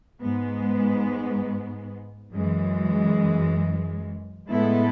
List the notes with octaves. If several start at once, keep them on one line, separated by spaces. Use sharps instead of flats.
G#2 G#3 B3
F#2 E3 G#3
A2 G#3 B3 E4 A4